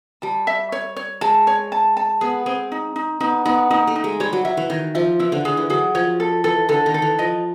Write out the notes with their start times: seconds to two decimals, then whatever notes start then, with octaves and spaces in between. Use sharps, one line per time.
0.22 G3 A5
0.47 E5
0.72 C#5
0.96 C#5
1.21 G#3 A5
1.47 C#5
1.72 A5
1.97 A5
2.21 B3 G#4
2.46 C4 G#4
2.72 D#4
2.96 D#4
3.20 B3 D#4
3.45 B3 D#4
3.71 A#3 D#4
3.87 A3
3.96 D#4
4.04 G#3
4.20 G3 C#5
4.33 F#3
4.45 F#3 E5
4.57 E3
4.70 D#3 C#5
4.95 F3 E5
5.19 E3 E4
5.32 D3
5.45 D3 G#4
5.57 E3
5.70 F#3 G#4
5.95 F3 C#5
6.20 A4
6.44 E3 A4
6.69 D3 A4
6.86 D#3
6.94 A4
7.02 E3
7.19 F3 D#5